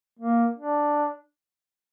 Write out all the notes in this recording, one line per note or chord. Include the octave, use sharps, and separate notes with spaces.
A#3
D4